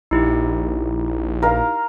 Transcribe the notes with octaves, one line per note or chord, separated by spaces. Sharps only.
A#1 D#4 E4 G4
A#4 F5